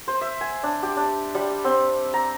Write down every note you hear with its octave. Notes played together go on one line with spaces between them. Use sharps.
C5
E5
G#5
D4
G4
D4
G3
C4
A#5